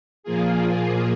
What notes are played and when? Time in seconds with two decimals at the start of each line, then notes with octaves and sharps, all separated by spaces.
0.23 A#2 F3 A#3 F4 G#4